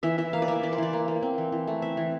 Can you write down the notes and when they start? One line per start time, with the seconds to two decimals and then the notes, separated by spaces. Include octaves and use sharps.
0.03 E3 E5
0.18 E3 E5
0.33 A#3 F5
0.42 D5
0.48 A#3 E5
0.63 E3 D5
0.73 C5
0.78 E3 D5
0.93 A#3
1.08 A#3
1.22 C4
1.38 E3
1.52 E3
1.67 A3
1.82 C4 E5
1.97 E3